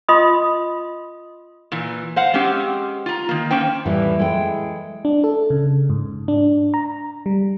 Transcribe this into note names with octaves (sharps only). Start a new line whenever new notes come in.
F4 D#5 B5 C6 D#6
A#2 E3
C5 F5 F#5
G#3 C4 C#4 G4
F4 A#5
D#3 A#3
A#3 C#4 C5 G5
A2 E3 G3 E4
G#3 A4 G5
D4
A4
C#3
G#2
D4
A#5
G3